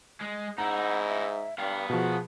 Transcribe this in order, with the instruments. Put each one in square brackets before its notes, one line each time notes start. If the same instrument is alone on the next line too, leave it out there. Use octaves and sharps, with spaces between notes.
[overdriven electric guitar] G#3
[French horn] G#2 [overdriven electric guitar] D#4 E4 [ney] F#5 [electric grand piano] A#5
[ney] E5
[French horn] G2 [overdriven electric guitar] B3 F5 [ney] G5
[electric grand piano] B2 F3 [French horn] F#4 [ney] G#4